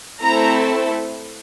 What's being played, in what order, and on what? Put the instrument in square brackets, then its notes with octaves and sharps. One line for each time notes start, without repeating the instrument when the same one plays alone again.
[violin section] A3 C4 E4 A4 A#5